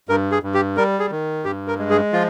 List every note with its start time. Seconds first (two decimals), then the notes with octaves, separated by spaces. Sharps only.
0.09 G2 A#4
0.32 G#4
0.43 G2
0.54 G4
0.77 G3 A#4
1.00 G#4
1.11 D#3
1.45 G2 G4
1.68 A#4
1.79 G#3
1.90 G#4
2.13 F3 F4